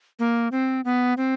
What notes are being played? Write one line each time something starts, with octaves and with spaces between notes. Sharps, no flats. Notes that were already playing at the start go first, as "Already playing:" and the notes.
A#3
C4
B3
C4